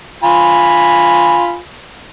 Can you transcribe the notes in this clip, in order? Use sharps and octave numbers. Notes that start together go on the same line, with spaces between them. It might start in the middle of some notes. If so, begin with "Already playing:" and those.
F4 G#5 B5